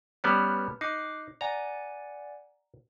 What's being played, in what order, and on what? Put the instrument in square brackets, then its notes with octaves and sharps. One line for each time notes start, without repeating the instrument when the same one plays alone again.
[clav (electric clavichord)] G3 B3 C#4 [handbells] B4 F6
[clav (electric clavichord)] D#4 [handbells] D6 F#6 C7
[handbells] D5 F#5 G#5 [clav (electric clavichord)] A#5